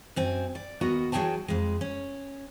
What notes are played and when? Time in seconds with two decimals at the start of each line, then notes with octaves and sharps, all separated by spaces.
0.16 F#2 C4 G#5
0.55 D5
0.81 D#2 B3 F#4 A#4 D#5
1.12 E3 F#3 A3 G#4 G5 A5
1.48 F2 G#3
1.81 C#4